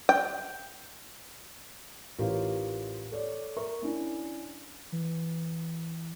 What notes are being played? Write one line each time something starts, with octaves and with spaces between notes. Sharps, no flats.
G5
A1 F4 G4 A#4 B4 C#5
A4 C#5 D5
A#4 E5 C#6
C#4 D4 E4
E3